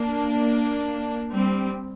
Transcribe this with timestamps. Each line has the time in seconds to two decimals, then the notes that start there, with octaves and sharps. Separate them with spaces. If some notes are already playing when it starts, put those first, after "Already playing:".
Already playing: A#3 D4
1.32 G3 C4